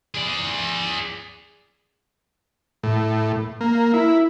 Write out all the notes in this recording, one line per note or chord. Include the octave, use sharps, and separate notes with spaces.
G#4 D5
A2
A#3
E4